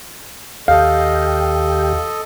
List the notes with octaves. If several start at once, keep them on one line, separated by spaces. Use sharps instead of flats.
D#2 G4 A4 D#5 F5 G5